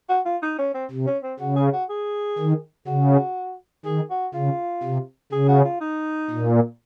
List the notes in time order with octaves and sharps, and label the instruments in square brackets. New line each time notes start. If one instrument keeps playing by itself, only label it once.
[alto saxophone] F#4
F4
D#4
C#4
C4
[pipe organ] C3
[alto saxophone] C#4
C4
[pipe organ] C#3 [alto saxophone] F#4
[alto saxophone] G#4
F#4
G#4
[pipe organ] D#3
[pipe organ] C#3 [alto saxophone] F#4
[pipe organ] D#3 [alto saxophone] G#4
[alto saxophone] F#4
[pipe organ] C#3 [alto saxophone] F4
[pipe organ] C3
[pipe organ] C#3 [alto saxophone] G#4
[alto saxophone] F#4
F4
D#4
[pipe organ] A#2